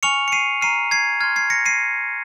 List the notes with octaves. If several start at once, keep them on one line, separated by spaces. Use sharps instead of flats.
G#5 C#6 F6 C#7 F7
C#7
C7 D#7
A#5 F6 C7 D#7
G#6 C7
C6 F6 G#6
G#6 C7
A#6 C#7
C7 D#7